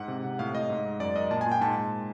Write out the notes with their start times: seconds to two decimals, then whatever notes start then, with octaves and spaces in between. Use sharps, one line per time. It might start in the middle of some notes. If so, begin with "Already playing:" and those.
Already playing: G#2 F#5
0.08 C3
0.24 C3
0.39 A2 F5
0.54 A2 D#5
0.70 G#2
0.85 G#2
1.00 F#2 D5
1.16 F#2 D#5
1.31 A#2 A5
1.41 G#5
1.46 A#2
1.52 G5
1.61 G#2 A5
1.76 G#2